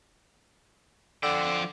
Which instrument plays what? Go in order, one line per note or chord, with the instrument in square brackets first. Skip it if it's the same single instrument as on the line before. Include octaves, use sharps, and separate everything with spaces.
[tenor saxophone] D3 [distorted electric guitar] F3 G5